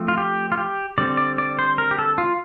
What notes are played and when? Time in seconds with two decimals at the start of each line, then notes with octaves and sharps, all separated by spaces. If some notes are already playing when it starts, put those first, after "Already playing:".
Already playing: F3 A3 C4
0.08 F4
0.18 G4
0.52 F4
0.57 G4
0.98 D3 G3 C4 D5
1.17 D5
1.38 D5
1.59 C5
1.78 A#4
1.91 G4
1.99 A4
2.18 F4